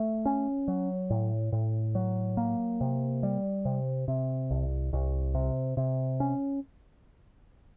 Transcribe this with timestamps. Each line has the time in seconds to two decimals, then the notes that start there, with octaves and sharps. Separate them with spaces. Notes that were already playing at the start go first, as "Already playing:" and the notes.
Already playing: A3
0.26 C#4
0.68 F#3
1.10 A2
1.52 A2
1.95 F#3
2.37 A#3
2.81 C3
3.23 G3
3.65 C3
4.08 C3
4.51 C2
4.93 C2
5.35 C3
5.77 C3
6.20 C#4